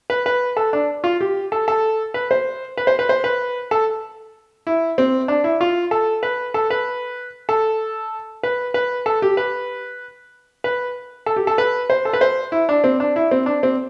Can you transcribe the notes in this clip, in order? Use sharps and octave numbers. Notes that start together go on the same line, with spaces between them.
B4
B4
A4
D4
F4
G4
A4
A4
B4
C5
B4
C5
B4
C5
B4
A4
E4
C4
D4
E4
F4
A4
B4
A4
B4
A4
B4
B4
A4
G4
B4
B4
A4
G4
A4
B4
C5
A4
B4
C5
E4
D4
C4
D4
E4
C4
D4
C4